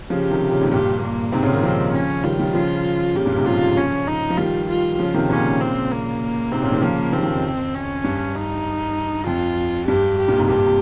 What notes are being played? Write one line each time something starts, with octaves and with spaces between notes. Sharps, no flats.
C#3 F3 G4
C3 D#3
A#2 C#3
G#2 C3
G2 A#2 G4
A#3
G#2 C3 C4
A#2 C#3
C3 D#3
C#3 F3 C4
C#4
D#3 G3 F4
D#3 G3
C#3 F3 F4
A#2 C#3 G4
G2 A#2
G#2 C3
C#3 F3 F4
C#4
D#4
F3
D#3 G3 F4
F4
C#3 F3
C3 D#3
A#2 C#3 C#4
C4
A#3
G#2 C3 C4
A#2 C#3
C3 D#3
C#3 F3 A#3
C3 D#3 C4
C3 D#3
F2
C#4
G2
D#4
F2 F4
G2 G4
G4
G2 A#2
G#2 C3
G2 A#2 G4
C3